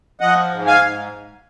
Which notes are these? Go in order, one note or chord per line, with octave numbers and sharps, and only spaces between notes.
F3 D#5 F#5
G#2
F5 G#5
G#2